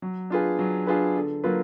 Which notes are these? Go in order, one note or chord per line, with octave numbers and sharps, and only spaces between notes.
F#3
D4 F4 G#4 B4
F#3
D4 F4 G#4 B4
D3
F#3 A#3 F4 B4